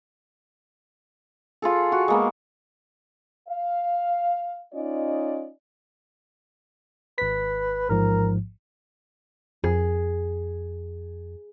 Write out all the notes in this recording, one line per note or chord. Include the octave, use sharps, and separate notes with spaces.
F4 G#4 A4
F#4
G#3 A#3 B3
F5
C#4 D#4 F4 D5 D#5
G#1 B4 B6
A1 G#2 F3 A#4
F2 G#4